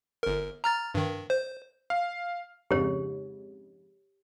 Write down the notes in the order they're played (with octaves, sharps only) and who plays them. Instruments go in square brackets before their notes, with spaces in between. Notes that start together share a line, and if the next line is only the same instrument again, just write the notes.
[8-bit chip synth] G1 A#4
A#5 F6 A6
G2 D#3
C5
[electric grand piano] F5
[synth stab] F2 G#2 C#3 [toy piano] G4 C#5